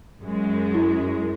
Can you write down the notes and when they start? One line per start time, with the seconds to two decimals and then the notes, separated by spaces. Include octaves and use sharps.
0.21 F#2 G#3
0.74 E4